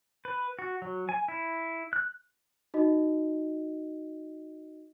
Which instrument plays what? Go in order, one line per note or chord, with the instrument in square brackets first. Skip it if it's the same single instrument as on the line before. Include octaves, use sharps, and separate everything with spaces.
[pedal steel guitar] B4
F#4
F#3
G#5
E4
F#6
[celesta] D#4 F#4 D#5